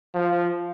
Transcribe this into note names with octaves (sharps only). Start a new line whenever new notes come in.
F3